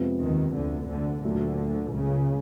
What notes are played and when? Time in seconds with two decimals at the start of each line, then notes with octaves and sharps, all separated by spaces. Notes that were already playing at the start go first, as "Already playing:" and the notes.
Already playing: F2 C3 F3 G#3 B3
0.20 D#2 D#3
0.55 D2 D3
0.89 D2 D3
1.24 D2 A#2 D3 F#3 A3
1.93 C#2 C#3